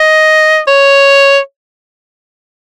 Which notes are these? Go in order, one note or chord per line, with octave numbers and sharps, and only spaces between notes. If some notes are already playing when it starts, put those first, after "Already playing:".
Already playing: D#5
C#5